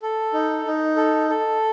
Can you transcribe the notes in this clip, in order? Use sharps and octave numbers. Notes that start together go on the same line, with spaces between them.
A4
D#4
D#4
A4
A4